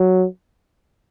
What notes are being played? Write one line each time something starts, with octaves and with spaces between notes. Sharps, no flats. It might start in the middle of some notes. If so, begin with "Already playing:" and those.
Already playing: F#3